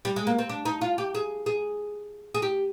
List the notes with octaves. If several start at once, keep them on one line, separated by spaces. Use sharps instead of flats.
G3
G#3
A#3
C4
D4
D#4
F4
G4
G#4
G#4
G#4
G4